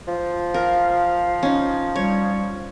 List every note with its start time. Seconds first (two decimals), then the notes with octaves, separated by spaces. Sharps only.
0.07 F3
0.54 A#4 F5
1.43 C#4 D#4
1.96 G3 C#5